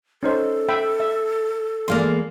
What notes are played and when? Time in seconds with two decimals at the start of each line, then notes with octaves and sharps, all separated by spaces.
0.23 C#4 D#4 A4 C5
0.69 E5 G5 B5
1.00 E5
1.88 E2 G#3 A#3 D5 F5 C6